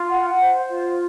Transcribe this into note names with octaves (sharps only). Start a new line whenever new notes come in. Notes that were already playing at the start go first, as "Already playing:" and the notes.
Already playing: F4
F#5
C5
F4